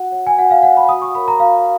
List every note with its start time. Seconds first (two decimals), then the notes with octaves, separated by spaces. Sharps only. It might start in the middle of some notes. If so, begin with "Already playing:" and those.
Already playing: F#4 F#5
0.12 C#5 F#5
0.27 G#5
0.37 F#4 F#5
0.51 F5
0.63 C#5 F#5
0.77 B5
0.89 F#4 D#6
1.02 C#6
1.15 A#4 C#5 B5
1.28 A#5
1.40 F#4 F5